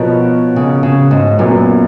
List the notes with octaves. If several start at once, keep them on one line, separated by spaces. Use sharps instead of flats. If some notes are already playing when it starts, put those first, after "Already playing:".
Already playing: B2 F3 B3 F#4 A#4 C#5
C#3
C#3
G#2
F#2 A#2 F#3 B3